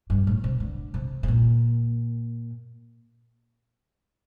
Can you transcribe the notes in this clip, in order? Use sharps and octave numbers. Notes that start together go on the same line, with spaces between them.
G2
A2
C3
D3
C3
C3
A#2